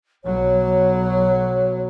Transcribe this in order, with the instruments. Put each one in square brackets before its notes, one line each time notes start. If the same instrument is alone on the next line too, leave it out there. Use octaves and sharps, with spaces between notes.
[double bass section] B1 F#3 [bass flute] C#5